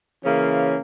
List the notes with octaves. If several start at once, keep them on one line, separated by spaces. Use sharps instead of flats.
C#3 E3 A#3 C#4